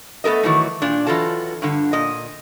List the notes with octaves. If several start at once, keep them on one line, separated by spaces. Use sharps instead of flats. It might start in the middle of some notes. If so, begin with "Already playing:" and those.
A3 B3 A4 A#4 D#5
D#3 E3 F#3 A3
A#2 D4
E3 F#3 F4 A4 A5
G2 D3
A#2 D#5